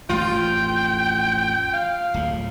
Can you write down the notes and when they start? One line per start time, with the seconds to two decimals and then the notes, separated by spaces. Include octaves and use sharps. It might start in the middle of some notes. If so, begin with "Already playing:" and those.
0.09 A1 F2 F4 G5
1.73 F5
2.14 D1 A2